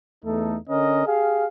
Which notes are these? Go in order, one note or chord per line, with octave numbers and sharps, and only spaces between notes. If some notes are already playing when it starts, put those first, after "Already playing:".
E2 A3 D#4 A4
D3 C#4 A#4 D#5
G4 G#4 F5